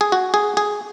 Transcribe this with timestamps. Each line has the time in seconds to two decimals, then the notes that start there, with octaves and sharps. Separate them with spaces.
0.01 G#4
0.12 F#4
0.34 G#4
0.57 G#4